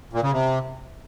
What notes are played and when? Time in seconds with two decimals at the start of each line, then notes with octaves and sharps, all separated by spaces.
0.13 A#2
0.22 C#3
0.32 C3